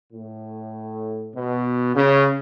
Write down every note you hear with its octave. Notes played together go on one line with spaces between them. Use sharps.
A2
B2
C#3